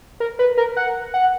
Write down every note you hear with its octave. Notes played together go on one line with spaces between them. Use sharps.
A#4
B4
A#4
F#5
F#5